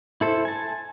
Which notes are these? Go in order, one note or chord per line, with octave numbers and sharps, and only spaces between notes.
E4 A4 C5
G#5 A5